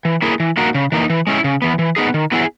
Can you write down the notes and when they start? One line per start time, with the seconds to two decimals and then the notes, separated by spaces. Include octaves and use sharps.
0.05 E3
0.22 A#3 E4 G#4
0.40 E3
0.57 A#3 D#4 F#4 A#4
0.75 C#3
0.92 E3 A#3 D#4
1.10 E3
1.27 G#3 C#4 E4
1.44 C#3
1.62 E3 B3
1.79 E3
1.96 B3 D#4 G#4
2.14 D#3
2.32 F#3 B3 E4 G#4